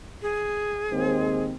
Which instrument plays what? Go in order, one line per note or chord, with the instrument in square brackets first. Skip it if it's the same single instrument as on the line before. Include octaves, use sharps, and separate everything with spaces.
[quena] G#4
[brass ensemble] D#2 G#3 C4